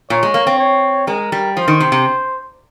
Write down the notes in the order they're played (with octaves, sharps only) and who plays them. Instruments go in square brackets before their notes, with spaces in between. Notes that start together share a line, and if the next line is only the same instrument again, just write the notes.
[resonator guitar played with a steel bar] A#2 [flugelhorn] C#5
[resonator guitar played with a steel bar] G#3
A#3
C4
[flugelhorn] C#5
[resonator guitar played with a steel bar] G#3 [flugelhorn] A#4
[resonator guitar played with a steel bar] G3
[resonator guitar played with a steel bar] F3 [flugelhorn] C5
[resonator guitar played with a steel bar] D#3
C3
C3